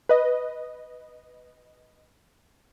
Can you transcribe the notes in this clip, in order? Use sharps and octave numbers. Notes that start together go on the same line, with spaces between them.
B4 D#5